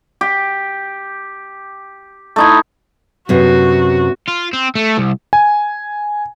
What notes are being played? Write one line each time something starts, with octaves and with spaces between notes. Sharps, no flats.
G4
A3 D#4 E4
F#2 C3 B3 F#4
F4
C4
A3
C2
G#5